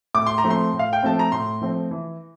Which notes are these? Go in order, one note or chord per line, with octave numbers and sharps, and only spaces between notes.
A2 D6
C6
A#5
F3 A3 C4
C6
A2
F5
G5
F3 A3 C4 A5
A#5
A2 C6
F3 A3 C4
E3